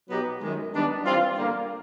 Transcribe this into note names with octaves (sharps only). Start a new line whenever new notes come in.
B2 F#3 B3 D#4 G4
F#2 D#3 G#3
D#3 G3 B3 D4
E3 G3 C4 F4
D3 G3 A#3